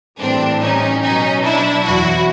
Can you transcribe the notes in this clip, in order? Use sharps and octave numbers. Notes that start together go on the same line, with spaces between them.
A2 E3 G3 C4 D4
C#4 D#4
B2 F#3 C#4 D#4
D4 E4
E2 B2 F#3 E4 F#4